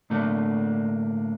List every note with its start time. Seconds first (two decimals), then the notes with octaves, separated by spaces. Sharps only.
0.10 A2 D3 A3 A#3 D4